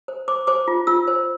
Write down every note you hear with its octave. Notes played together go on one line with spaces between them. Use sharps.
C5
C5 D6
C5 D6
F4
F4 E6
C5